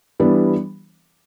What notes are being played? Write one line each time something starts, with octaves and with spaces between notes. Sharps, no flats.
E3 G3 B3 D4